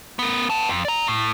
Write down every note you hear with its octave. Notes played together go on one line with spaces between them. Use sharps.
B3 A#4
B3 A5
F2
D5 A#5
A2